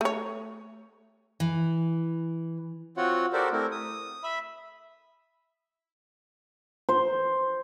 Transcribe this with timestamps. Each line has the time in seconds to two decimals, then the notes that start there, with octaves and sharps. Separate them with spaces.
0.01 A3 C#5
1.40 E3
2.97 C4 F4 F#4 C#5 F#5
3.33 F#4 G4 A4 A#4 C5 D5
3.52 A3 C4 E4 A#4
3.71 D#6
4.23 E5 B5
6.89 C5